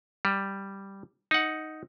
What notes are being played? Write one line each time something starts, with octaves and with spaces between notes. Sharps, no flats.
G3
D#4 F#5